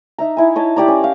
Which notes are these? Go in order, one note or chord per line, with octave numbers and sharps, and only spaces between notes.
D#4 E5 A#5
D#4 E4 G#5
C#5 D#5 A5
E4 G4 D5 A#5
C#4
A#4 F5